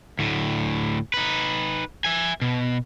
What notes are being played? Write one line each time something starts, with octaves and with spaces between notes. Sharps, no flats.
D2 A2
D#4 B4
E5 G#5
B2